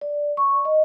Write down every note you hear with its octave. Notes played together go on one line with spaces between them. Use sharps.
D5
C#6
D#5